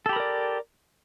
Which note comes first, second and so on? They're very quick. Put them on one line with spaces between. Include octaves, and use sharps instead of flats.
A4 G4 B5 A#4 D5